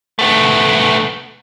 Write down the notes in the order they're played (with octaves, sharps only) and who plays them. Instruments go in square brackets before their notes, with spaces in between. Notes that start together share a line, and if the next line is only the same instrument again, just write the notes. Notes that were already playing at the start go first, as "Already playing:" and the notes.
[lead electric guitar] A3 B3